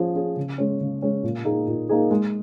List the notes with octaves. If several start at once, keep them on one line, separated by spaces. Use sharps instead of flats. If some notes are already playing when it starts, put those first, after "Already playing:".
Already playing: F3 C#4 G#4
C#4 G#4
C#3
G#3 C#4
C#3
G#3 C#4
A#2
A#3 D#4 G#4
A#2
A#3 D#4 G#4
G#3